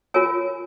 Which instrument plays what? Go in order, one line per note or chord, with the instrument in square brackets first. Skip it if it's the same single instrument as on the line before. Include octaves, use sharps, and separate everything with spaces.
[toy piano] F4 A#4 C#5 G#5